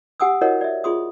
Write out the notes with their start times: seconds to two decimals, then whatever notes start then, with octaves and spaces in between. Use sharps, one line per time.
0.20 G4 F#5 G#5 D#6 E6
0.41 E4 F#4 A#4 C#5 D#5 F#5
0.61 D5 E5
0.84 F4 G#4 C6 D#6